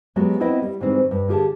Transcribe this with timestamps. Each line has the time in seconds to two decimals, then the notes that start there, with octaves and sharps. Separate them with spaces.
0.16 F#3 G#3 B3 F#4 G4
0.40 B3 C4 E4 B4 D#5 G5
0.62 G3
0.80 G#2 D#3 E3 G3 C4 D#4
1.11 G2
1.28 D3 F4 G4 G#4 G5 A5